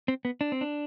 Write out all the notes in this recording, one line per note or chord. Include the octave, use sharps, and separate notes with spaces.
C4
B3
D4
C4
D4